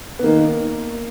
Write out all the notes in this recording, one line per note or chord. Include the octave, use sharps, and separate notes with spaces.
B3
D#3 A#3